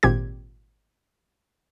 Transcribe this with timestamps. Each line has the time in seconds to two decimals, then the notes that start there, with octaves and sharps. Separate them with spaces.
0.03 G#1 A#2 C4 G4 G#6